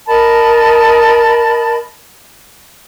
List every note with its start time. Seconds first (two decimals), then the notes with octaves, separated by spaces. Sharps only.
0.07 A#4 D#5 A5 B5